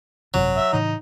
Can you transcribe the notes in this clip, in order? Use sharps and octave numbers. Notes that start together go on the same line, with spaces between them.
G#1 F#2 C3 F#3
E5
A2 C#3 E3 D#4